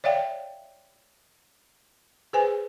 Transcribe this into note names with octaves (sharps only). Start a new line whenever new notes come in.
C#5 D5 E5 F5 G5
G#4 B4 C5 G#5